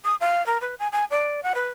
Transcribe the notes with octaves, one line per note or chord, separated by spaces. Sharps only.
D#6
F5
A#4
B4
G#5
G#5
D5
F#5
B4